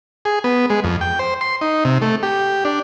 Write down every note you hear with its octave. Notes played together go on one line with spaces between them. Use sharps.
G#4
B3
G#3
F2
G5
C5
C6
D#4
C3
A3
G4
D4